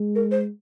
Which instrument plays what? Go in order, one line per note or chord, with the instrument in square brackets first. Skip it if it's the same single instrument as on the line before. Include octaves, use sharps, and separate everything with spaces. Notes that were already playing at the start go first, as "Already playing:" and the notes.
Already playing: [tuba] G#3
[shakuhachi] A#4
C5